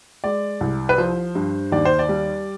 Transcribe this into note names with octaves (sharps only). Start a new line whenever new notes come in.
G#3 D5
C2
B4
F3 C5
G2
D#2 D5
C5
D5
G3